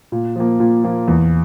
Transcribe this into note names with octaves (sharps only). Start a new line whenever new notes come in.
A#2
F3 A#3
A#2
F3 A#3
E2